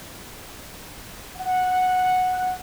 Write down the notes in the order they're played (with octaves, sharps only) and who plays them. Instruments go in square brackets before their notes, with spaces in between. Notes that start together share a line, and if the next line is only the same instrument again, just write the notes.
[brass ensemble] F#5